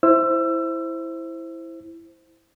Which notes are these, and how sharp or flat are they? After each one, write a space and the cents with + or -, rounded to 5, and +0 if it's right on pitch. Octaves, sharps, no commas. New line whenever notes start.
E4 +0 C5 +0 E6 +25